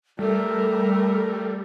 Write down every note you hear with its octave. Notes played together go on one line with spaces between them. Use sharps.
G3 A3 A4 A#4